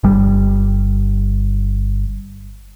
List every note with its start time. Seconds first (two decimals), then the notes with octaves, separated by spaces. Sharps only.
0.03 G1 G3